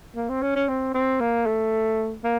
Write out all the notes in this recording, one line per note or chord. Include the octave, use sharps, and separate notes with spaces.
A#3
C4
C#4
C#4
C4
C4
A#3
A3
A#3